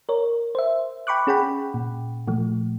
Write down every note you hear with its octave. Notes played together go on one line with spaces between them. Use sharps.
A#4 C#5
C5 E5
G5 B5 C#6 D6 F#6
C#4 G#4 F#5 G5 B5
A#2
A#2 F3 A3